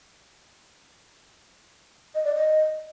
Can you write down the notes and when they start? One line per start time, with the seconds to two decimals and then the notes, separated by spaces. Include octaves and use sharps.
2.15 D#5
2.25 D5
2.35 D#5